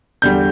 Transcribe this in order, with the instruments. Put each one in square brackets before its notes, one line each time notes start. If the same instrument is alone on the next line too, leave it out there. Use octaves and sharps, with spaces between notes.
[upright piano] E2 D3 G3 G6